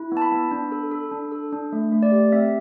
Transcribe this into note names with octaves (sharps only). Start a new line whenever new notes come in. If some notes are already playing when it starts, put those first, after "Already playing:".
Already playing: E4
B3
A5
B5
B3
D4
A4
A4
D4
A4
D4
A3
A3
D5
G4
C4 E5